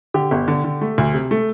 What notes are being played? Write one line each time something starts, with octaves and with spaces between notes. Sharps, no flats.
D3 G4
G1
D3
D3
A3
D2
C3
A3